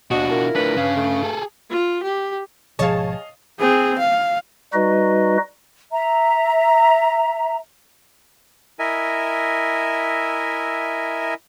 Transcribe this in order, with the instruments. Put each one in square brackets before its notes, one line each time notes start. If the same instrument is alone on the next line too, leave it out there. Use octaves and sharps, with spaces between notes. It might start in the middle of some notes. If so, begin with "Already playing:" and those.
[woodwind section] D#2 D#5 [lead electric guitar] B2 D4 [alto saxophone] F#4
[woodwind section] E4 F4 A#4
[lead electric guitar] A2 D4 [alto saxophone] B4
[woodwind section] G2 F5 [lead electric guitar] C#3
[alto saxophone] A3
[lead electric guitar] G#4 A4
[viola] F4
G4
[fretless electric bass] G#1 B2 F3 [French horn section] G#4 [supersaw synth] C#5 A5 [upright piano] D#5 F5
[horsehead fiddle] C4 G#4
F5
[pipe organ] G3 D#4 F#4 B4 D#5
[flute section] E5 A#5
[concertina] E4 A#4 D#5 E5 G#5